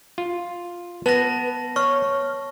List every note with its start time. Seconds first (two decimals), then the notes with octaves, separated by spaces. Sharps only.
0.18 F4
1.06 B3 B4 A5 A#6
1.76 C#5 C#6 F6